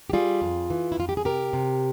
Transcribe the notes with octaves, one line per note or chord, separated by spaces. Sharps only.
G4
G3 F4 G#4
F2
E3
E4
F2 F4
G4
G#4
C3 G4 A#4
C3